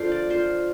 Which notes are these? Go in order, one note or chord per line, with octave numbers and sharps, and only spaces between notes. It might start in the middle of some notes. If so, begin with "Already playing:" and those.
Already playing: F3 D4 F4 A4 F5 G5
D5
F4 C5